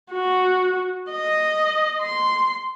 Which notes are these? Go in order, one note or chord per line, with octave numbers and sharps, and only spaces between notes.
F#4
D#5
C6